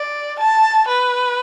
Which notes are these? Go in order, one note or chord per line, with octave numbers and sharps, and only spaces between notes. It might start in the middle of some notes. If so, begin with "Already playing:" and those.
Already playing: D5
A5
B4